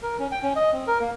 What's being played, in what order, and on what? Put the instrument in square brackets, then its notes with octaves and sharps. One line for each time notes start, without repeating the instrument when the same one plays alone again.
[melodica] A#4
C#4
G5
C#4
D#5
C4
A#4
A#3